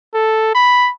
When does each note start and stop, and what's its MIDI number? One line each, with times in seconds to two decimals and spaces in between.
0.15 0.53 69
0.55 0.91 83